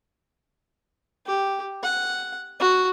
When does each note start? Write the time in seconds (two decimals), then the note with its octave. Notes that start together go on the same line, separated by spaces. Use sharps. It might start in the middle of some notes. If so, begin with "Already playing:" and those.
1.26 G4
1.83 F#5
2.60 F#4